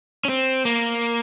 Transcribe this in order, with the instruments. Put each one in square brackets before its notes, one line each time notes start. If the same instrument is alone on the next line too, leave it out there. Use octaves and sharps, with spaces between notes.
[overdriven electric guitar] C#4
C4
A#3